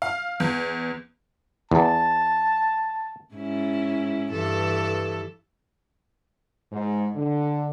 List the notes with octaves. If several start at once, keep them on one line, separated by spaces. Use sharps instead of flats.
F5
E2
E2 A5
G#2 C#4 E4
G2 E3 A4
G#2
D3